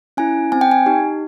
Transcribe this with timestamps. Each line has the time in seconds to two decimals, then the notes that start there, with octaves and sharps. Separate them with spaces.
0.17 C#4 E4 G#5
0.52 C4 G#5
0.61 G5
0.71 G#5
0.86 D#4 G4